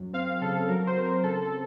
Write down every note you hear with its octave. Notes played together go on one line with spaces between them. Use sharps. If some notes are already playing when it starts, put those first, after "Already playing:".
Already playing: F#2
C4 F5
C#3 A4
F#3 A#4
C5
C4
A#4
C#3 A4
A4